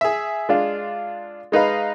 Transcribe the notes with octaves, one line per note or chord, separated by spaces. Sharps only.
G#4 E5
G#3 D4 F4
G#3 D#4 B4 F5